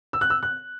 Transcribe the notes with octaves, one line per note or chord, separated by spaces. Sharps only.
E6
F#6
E6
F#6